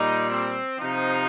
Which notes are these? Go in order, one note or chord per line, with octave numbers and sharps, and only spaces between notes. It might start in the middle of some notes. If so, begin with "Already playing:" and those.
Already playing: A#2 G3 D#4
C4
C3 F3 D#4